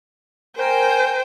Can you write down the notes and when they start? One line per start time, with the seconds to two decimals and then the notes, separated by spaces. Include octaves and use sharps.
0.56 A#4 C5 G5 G#5